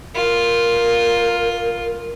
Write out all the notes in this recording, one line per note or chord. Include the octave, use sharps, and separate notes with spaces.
F4 A#4